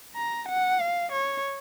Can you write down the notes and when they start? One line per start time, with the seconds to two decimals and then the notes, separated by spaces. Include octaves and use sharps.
0.16 A#5
0.49 F#5
0.81 F5
1.12 C#5